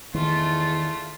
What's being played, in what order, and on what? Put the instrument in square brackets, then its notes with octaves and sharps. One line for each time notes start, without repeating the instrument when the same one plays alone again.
[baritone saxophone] E2 [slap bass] D#3 [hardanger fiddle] A3 F4